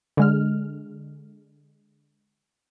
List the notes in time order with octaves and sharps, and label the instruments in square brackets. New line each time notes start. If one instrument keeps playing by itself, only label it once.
[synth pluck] D3 G#3 F6